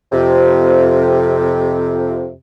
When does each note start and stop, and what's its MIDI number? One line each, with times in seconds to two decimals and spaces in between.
0.12 2.30 41
0.12 2.30 48